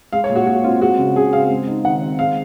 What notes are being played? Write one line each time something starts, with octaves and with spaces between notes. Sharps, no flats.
G#3 F5
C#5
A#2
F#4
A#2 F#4
C4 F4
G#3 F#4
C#3
C#3 G#4
C4 F5
G#3
D#4
D#3 F#5
C4
G#3 F5